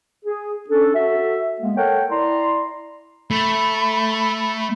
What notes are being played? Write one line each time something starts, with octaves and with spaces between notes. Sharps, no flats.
G#4
C#4 D4 A4
F#4 A4 E5
G#3 A#3 B3
A4 A#4 C#5 F#5 G5
E4 D5 A#5 C6
A3 B5